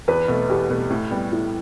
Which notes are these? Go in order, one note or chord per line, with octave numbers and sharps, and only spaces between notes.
E2 B4
B2 A3
E2 G4
B2 A3
A2
G3 B3
A2 E4